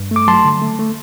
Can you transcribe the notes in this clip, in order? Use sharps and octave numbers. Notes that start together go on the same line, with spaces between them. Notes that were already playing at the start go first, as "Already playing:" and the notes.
Already playing: G2
A3 D6
F#3 A5 C6
D3
A3
A3